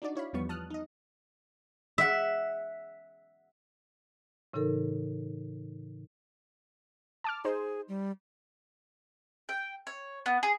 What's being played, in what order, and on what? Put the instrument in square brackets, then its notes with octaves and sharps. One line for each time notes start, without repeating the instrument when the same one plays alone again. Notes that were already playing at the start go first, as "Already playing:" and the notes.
[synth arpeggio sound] D4 D#4 F#4 D5
E4 C#5 F5 B5
E2 F3 G3 B3 C#6
A5 D#6 F6 F#6
D#4 D#5
[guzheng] E5 F#5
[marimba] A2 C#3 E3 D#4 A4 A#4
[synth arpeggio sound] A5 D6 F6
[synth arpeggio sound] D#4 C5 [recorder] G#4
[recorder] G3
[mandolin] G5
C#5
B3
G#4